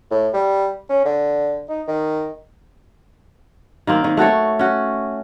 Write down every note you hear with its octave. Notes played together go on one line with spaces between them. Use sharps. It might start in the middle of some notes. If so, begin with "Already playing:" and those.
A2
G3
C#4
D3
D#4
D#3
D#3 A#3 C4
D#3
A3 F#4 A4 C#5
C#4 F#4